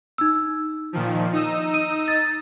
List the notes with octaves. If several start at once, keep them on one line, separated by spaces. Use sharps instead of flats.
D#4 E6
A#2 D#3 F3
D#4 D#6 E6
D#7
A6